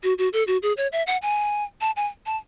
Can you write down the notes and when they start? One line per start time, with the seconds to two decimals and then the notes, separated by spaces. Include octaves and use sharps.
0.03 F#4
0.18 F#4
0.33 A4
0.47 F#4
0.63 G#4
0.77 C#5
0.92 E5
1.07 F#5
1.22 G#5
1.81 A5
1.96 G#5
2.26 A5